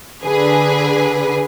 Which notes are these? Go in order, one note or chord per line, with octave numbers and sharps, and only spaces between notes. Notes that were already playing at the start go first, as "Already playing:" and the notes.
D3 G#4 B4 G#5